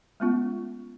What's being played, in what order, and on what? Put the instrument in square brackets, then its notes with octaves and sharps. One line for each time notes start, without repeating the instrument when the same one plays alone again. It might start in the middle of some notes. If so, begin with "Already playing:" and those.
[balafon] G#3 A3 B3 C#4 F4